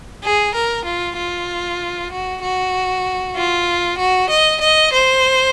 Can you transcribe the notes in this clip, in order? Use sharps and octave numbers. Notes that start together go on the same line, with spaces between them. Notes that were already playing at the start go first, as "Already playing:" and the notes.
G#4
A#4
F4
F4
F#4
F#4
F4
F#4
D#5
D#5
C5